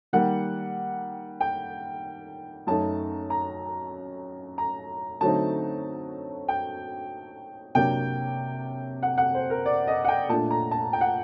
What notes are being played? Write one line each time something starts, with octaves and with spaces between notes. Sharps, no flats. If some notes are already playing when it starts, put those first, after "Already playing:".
D#3 G3 A#3 F#5
G5
F#2 F#3 A3 D#4 A5
A#5
A#5
D3 F#3 A3 C4 D#4 A5
G5
C3 F#3 A#3 D4 G5
F#5
F#5
C5
A#4
D5
D#5
F#5
G5
A#2 A3 D4 A5
A#5
A5
G5
F#5